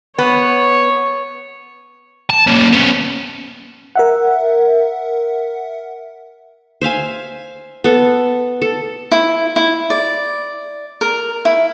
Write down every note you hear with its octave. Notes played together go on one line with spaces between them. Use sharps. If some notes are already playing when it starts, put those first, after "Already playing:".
B3 C#5
A5
A#3 C#4
B3 C#4
A#4 E5 F#5
C5 E5 F5 G#5
B3 A4
A4
E4
E4
D5
A#4
E4